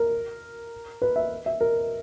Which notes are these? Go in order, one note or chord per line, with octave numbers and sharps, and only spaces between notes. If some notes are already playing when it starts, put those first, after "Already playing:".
Already playing: A#4
B4
E5
E5
A#4